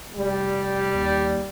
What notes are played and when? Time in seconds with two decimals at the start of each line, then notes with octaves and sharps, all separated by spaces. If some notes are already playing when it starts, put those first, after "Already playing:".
0.16 F1 G3
0.94 D#2